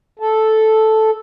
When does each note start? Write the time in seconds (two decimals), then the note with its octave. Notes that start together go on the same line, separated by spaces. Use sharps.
0.19 A4